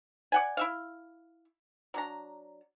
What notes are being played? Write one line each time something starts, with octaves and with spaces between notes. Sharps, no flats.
D5 F#5 G#5
E4 E5 F5
F#3 D4 A#5